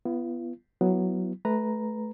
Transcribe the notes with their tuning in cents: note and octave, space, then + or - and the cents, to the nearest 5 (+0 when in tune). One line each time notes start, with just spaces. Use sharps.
B3 +0 F4 -45
F#3 +0 B3 +0 E4 +10
A3 -25 B4 +0 A#5 +0